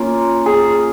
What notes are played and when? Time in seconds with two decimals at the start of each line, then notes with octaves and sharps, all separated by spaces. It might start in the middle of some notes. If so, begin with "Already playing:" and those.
Already playing: A#3 C#4 F4
0.46 G#4